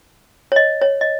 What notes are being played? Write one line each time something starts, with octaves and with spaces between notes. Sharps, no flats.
C#5
D#5
C#5
D#5